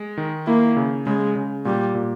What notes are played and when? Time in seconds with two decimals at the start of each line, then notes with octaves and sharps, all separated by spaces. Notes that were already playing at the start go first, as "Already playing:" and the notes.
Already playing: G#3
0.18 D#3
0.47 A#3 E4
0.77 C#3
1.06 C#3 G#3
1.36 C#3
1.65 A#2 G3
1.95 A#2